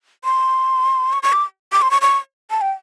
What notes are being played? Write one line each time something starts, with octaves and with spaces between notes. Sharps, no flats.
C6
C#6
C#6
D6
D6
C6
C#6
C#6
A5
G5